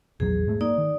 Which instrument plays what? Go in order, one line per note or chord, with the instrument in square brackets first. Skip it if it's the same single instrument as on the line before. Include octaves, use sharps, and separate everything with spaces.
[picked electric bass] A#1 E2 F#3 [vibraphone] G#4
[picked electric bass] G#2 G#3 A3
[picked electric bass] A#3 [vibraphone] D#4 D5
[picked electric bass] D#3